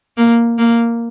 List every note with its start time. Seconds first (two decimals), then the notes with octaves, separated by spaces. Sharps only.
0.17 A#3
0.58 A#3